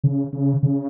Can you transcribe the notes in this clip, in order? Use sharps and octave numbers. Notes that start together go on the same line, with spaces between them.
C#3
C#3
C#3